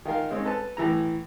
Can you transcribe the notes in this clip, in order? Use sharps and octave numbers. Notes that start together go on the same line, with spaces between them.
D#3 F4 A#4 F5
G#3 C4 C#4 D#4
A4 B4 A5
A2 E3 E4 A#5